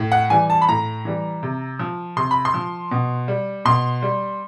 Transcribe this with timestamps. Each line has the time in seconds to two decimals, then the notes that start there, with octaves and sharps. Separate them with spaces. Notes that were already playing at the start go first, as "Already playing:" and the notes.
Already playing: A2
0.12 F#5
0.30 E3 G3 G#5
0.50 A5
0.62 B5
0.69 A2 A#5
1.05 E3 G3
1.43 C3
1.79 F3
2.17 C3 C6
2.31 B5
2.45 C6
2.54 F3
2.91 B2
3.28 G3
3.65 B2 C6
4.02 G3